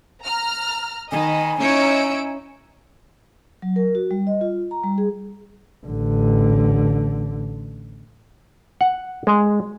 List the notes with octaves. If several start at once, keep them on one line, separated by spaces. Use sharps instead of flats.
A#5 F6
D#3 D#5 G#5 B5
C#4 D#4 E4 C#5 E6 D7
F#3
A#4
F#4
G3
D#5
F4
A#5
G3
G#4
A1 D3
F#5
G#3